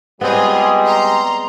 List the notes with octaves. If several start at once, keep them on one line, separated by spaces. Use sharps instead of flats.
G3 G#3 B3 C4 F4 G#4 D#5
A#5 C6